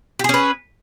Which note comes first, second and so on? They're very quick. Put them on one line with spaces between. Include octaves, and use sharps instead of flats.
G4 G#4 C#4 B4